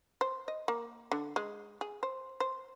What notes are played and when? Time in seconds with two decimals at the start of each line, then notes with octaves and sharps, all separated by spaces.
0.21 C5
0.48 D#5
0.68 A#3
1.11 D3
1.36 G#3
1.81 G#4
2.03 C5
2.40 C5